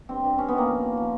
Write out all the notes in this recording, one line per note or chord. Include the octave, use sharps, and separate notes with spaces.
G2 C4
G2
G2 C#4
D#3 B3
A#3
F3
F3
F3